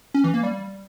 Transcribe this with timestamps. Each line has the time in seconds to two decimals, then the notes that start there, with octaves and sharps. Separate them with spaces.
0.14 C#4
0.24 E3
0.34 A#3
0.43 G3